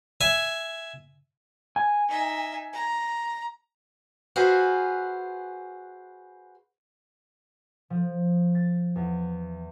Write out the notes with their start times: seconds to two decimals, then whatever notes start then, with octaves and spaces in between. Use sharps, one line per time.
0.21 E5 G#5
1.76 G#5
2.08 D#4 E5
2.73 A#5
4.36 F#4 G#4 B4 C5 F5
7.90 F3
8.55 A6
8.95 E2